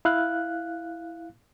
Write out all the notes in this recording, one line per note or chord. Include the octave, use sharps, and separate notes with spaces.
E4 F5 F#6